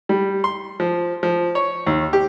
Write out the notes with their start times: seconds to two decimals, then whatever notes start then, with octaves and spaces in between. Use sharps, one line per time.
0.09 G3
0.44 C6
0.80 F3
1.23 F3
1.55 C#5
1.87 D#2
2.13 G4